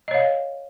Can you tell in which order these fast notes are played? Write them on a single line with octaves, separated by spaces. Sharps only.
D#5 C#5 F5